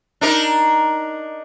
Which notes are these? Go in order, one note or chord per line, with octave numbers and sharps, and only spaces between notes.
D4 D#4 A#4